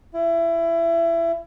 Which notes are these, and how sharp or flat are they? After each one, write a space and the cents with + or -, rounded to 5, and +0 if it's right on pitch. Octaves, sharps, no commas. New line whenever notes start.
E4 +25